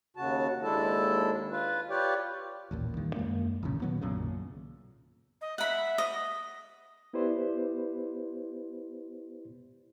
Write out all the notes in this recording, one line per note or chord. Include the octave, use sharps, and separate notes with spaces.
D#2 C#3 F#4 A5
D#2 G#3 D4 E4 A4 A5
F4 B4
F4 G4 B4 C#5 D5 G5
A1 D#2 A#2
G2 D#3
F#2 G#3 A#3
D#1 A1 C#3
A#2 D#3 F#3 B3
B1 F#2 A#2 C#3
D#5
E5 F#5 B5
D#5
B3 E4 G4 B4 C5 D5